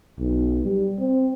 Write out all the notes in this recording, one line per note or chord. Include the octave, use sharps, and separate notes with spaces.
B1
G3
C4